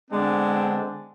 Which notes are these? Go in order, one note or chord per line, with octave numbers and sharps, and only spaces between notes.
D3 G#3 B3 C4 D4